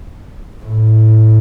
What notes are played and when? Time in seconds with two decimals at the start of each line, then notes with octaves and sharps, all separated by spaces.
0.63 A2